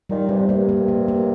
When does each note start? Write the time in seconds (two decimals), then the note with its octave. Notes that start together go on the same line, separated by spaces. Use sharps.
0.09 A#2 D#3 G3
0.28 G2 C3 G3
0.49 G2 C3 A#3
0.69 A#3
0.88 A#3
1.08 A#3